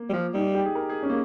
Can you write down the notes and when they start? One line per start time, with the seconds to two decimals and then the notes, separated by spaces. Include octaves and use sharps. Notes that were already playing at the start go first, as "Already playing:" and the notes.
Already playing: A#3
0.09 G3
0.13 F3
0.34 G3 D#4
0.55 G4
0.65 G#4
0.75 A#4
0.89 G#4
1.03 C#4
1.10 A#3